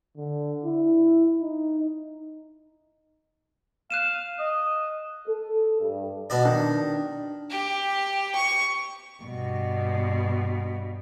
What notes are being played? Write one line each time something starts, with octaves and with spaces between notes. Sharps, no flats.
D3
E4
D#4
F5 F#6 D#7 E7
D#5
A4
G2
B2 D4 D5
D#3 D4
G4
C#6
G2 B2